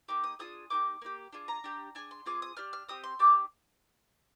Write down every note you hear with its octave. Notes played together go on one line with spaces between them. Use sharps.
A#3 D#4 G4 D6
D#6
D4 F4 G#4 D#6
A#3 D#4 G4 D6
A#3 D#4 G4
D4 F4 G#4
A#5
D4 G4
D4 G#4 G#5
C6
C4 F4 G#4 D6
D#6
D4 G4 F6
F6
C4 G4 D#6
C6
D4 G4 D6